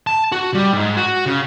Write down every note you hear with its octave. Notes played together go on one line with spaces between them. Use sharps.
A5
F#4
G3
G#2
F#4
C#3